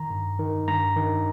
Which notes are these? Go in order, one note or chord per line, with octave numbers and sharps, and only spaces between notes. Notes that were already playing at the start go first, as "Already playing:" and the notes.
Already playing: D#3 A#5
G2
D#3
G2 A#5
D#3